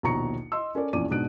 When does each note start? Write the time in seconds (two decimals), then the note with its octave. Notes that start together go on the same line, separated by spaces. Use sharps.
0.03 A#1 D#2 B2 A#5 C#6 C#7
0.52 D#5 C6 E6
0.75 C#4 A4 A#4 D5
0.93 A#1 E2 C#4 D5 D6 D#7
1.11 G#2 B2 D4 F#6 D7